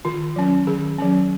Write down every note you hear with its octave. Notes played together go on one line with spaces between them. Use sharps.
D#3 F4
F#3 C#4
D#3 G#4
F#3 C#4